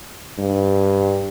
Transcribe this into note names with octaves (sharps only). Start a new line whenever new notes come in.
G2